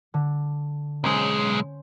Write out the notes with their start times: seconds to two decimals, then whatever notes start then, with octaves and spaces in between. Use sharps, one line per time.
0.14 D3
1.04 B1 G#3 C#4 C5